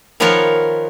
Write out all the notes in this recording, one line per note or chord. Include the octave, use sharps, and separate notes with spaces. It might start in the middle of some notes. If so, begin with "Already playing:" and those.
D#3 F3 B3 F4 A#4 C#5